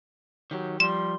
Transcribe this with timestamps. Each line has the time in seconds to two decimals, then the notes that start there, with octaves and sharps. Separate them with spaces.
0.51 D#3 F#3 G4
0.80 F3 G3 C6 E7